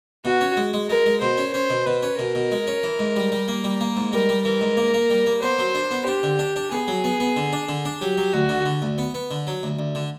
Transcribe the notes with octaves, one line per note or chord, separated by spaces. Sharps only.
B2 F#4
C#4
G#3
G#3
G#3 A#4
G#3
B2 C5
C#4
C#4 C5
B2
B2 B4
C#4
B2 A#4
B2
G#3
C#4
E3
G#2
G3
G3
A#3
G3
A#3
G#2
G3 A#4
G3
E3 A#4
G#2
A#3
A#3
G3
A#3
B3 C5
F#3
D4
B3
D4 G4
D3
D4
D4
B3 G#4
F#3
B3
B3
D3
D4
D3
D4
F#3 G4
F#3
D2 F#4
D3
D3
D2
B3
B3
D3
F#3
D2
D2
D3